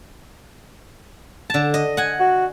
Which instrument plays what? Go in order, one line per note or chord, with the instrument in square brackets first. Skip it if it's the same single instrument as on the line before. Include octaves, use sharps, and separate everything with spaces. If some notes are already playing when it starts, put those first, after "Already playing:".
[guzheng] D3 A5
D#5
F#5 G#5
[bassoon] F#4